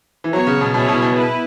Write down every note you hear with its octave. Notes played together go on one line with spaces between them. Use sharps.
E3
F#3 B3 F#4 C#5
C#3
B2
B2 C#4 E4 G#4 C#5
B2
B2
B3 E4 B4